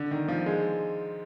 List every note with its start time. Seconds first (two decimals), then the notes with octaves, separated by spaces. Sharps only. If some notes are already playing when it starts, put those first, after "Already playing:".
Already playing: D3
0.11 D#3
0.28 F3
0.46 G#3